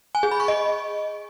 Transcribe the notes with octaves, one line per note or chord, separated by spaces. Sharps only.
G#5
G#4
B5
C#6
D#5